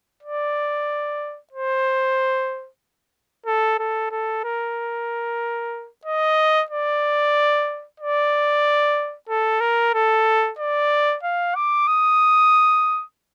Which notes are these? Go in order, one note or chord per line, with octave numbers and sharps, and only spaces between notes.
D5
C5
A4
A4
A4
A#4
D#5
D5
D5
A4
A#4
A4
D5
F5
D6
D#6